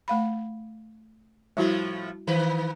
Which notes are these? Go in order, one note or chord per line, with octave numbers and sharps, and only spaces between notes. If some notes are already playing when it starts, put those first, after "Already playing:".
A3 F5 B5
A2 F3 G3 A3 E4 F#4
D#3 B4